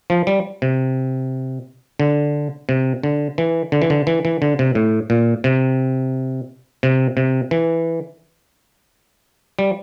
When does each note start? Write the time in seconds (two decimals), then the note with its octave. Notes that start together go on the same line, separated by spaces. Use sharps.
0.10 F3
0.27 G3
0.62 C3
2.00 D3
2.69 C3
3.03 D3
3.38 E3
3.72 D3
3.82 E3
3.90 D3
4.07 E3
4.25 E3
4.42 D3
4.59 C3
4.75 A2
5.10 A#2
5.44 C3
6.83 C3
7.17 C3
7.51 E3
9.59 G3